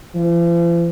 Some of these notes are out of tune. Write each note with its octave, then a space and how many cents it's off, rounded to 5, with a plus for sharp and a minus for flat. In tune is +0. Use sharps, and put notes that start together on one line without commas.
F3 -45